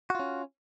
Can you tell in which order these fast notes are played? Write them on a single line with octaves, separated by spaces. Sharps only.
F#4 F4 C#4